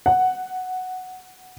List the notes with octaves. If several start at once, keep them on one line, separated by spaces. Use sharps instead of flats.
F#5